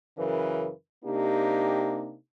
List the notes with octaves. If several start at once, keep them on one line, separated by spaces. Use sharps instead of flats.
F#2 C#3 E3 A#4 B4
C3 A#3 D4 D#4 G4